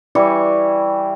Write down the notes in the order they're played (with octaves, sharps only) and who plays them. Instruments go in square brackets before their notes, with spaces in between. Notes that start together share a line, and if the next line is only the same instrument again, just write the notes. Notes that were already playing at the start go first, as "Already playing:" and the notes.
[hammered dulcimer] E3 G3 C#6